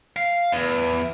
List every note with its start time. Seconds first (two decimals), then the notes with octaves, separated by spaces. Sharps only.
0.16 F5
0.52 E2